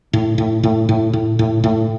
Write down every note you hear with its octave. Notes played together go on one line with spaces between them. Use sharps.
A2
A2
A2
A2
A2
A2
A2